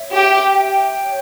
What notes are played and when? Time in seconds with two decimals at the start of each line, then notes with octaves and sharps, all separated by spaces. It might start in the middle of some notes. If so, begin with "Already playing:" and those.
Already playing: C#5 E5
0.12 G4 G5
0.58 G5
1.04 C#5